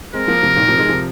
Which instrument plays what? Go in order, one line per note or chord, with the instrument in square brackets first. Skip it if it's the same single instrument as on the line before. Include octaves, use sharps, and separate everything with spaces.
[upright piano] G#3 C4 [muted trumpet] A#4
[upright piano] F3 A#3
C3 F3
A#2 D#3
C3 F3
D#3 G#3
C3 F3